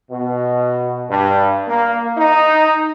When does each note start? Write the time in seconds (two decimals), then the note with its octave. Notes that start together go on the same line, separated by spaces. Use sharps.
0.11 B2
1.10 G2
1.68 A#3
2.18 D#4